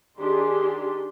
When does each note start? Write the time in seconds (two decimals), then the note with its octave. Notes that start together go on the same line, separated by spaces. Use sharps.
0.19 D#3 D4 G4 G#4 C6